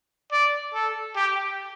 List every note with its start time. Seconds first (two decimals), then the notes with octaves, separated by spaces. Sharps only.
0.32 D5
0.74 A4
1.16 G4